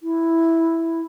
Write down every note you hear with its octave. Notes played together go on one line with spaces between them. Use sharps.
E4